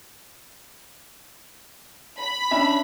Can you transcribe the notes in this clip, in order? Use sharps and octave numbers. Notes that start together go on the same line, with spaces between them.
B5
C#4 D4 E5